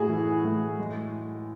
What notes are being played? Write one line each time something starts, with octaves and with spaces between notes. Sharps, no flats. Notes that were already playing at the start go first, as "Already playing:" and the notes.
Already playing: A2 E4 F#4 G#4
E3
A2
G#3